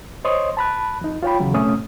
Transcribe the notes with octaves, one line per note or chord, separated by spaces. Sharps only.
C5 C#5 D#5 C6 D#6
A5 B5 F#6
F2 D#4
F4 C#5 G5 B5
E2 C#3 F#3
F2 A2 C3 A3 C#4 D#6